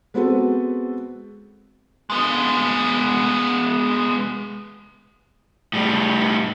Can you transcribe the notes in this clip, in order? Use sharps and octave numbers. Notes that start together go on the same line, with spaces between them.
G#3 B3 C4 F#4 A4 B4
G#3 B3
A2 G3